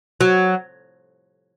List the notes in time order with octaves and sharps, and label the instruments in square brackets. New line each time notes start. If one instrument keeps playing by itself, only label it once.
[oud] F#3